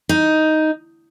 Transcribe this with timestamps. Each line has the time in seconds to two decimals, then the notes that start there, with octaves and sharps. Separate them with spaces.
0.09 D#4